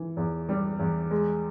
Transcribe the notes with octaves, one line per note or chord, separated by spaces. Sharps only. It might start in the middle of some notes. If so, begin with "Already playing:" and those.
Already playing: E3
E2
G3
E2
G#3